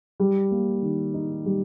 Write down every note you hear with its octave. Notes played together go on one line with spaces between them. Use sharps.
G3
A#3
D#3
D#4
G3